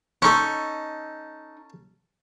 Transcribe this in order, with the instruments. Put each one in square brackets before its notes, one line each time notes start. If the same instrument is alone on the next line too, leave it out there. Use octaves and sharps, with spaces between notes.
[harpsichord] C#4 A4 [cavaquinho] D#4 C#6